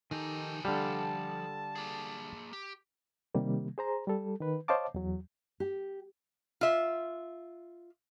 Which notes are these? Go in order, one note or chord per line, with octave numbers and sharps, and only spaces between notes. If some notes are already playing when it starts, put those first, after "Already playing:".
D#3 F3 D#4 G4 A4 G#5
D3 G3 A4 F5 A5
A#3 G#4
G4
C3 D#3 G3 A#3
G#4 C5 A#5
G3 A4
D#3 B4
C5 C#5 D#5 F5 A5 D6
E2 F#3
G4
F4 E5